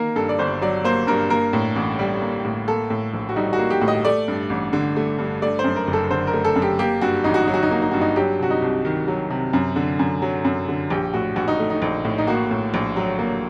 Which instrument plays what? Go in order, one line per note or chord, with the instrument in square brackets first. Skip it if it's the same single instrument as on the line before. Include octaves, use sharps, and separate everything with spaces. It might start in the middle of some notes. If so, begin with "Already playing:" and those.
Already playing: [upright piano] D#3 A#3 A#4
G2 A4
D5
G1 C5
F#3 D5
A#3 C5
G2 A#4
A#3 A#4
A2
A1
G3
A#3
A2
A#3 A4
A2
A#1
F#4
G3 D#4
F#4
A#3
G4
A2
D#5
A3 D5
G2
A1
D3
A3
G2
A3 D5
C5
F#2
A#4
F#1
A4
D3 C5
A#4
A3
A4
F#2
G4
A#3 G4
G2 F#4
A1 D#4
F#4
F#3 D#4
F#4
D#4
A#3 F#4
D#4
G2 F#4
D#4
F#3 G4
C3 F#4
D#4
C2
D#3
F#3
C3
F#2
D3
F#2
F#3
F#2
D3
A#1 G4
A2 F#4
A#1 F#4
D#4
A3
D#4
A#1
A2
D#4
A#3 F#4
A2
A#1
F#3
A#3